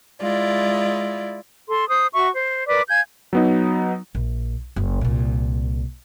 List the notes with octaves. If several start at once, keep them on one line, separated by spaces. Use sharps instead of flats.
G#3 E4 F4 D5
A4 C6
C5 D#6
F#4 E5 C#6
C5
A#4 B4 D5 D6
F5 G#5 G6 G#6
F#3 B3 D#4
A#1
F#1
C2 A#2